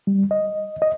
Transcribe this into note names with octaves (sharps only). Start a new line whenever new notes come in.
G3
D#5
D#5